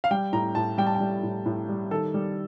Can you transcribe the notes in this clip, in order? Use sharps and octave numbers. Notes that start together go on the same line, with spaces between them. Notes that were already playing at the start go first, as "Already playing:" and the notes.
F5
G3 G5
A2 A#5
A2 A5
G3 G5
A5
G5
G3
A2
A2
G3
D#3 A4
G3